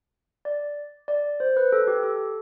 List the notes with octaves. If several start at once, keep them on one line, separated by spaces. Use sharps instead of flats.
D5
D5
C5
B4
A4
G4
A4